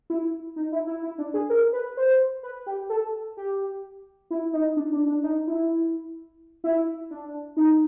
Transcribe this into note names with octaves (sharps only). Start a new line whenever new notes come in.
E4
D#4
E4
E4
E4
D4
G#4
A#4
B4
C5
B4
G4
A4
G4
E4
D#4
D4
D4
D4
D#4
E4
E4
D4
D#4